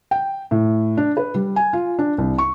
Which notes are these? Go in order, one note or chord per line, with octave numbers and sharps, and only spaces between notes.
G5
A2
D4
B4
G3
G#5
F4
D4
C2
C#6